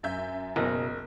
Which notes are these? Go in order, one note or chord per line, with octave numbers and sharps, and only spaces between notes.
F#2 E5 G6
F#1 B2 A#4 D#5